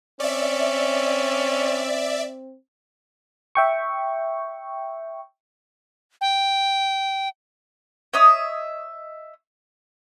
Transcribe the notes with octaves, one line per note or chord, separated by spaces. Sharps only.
C4 C#4 D5 E5
E5 G5 C#6
G5
C#5 D#5 E5 D#6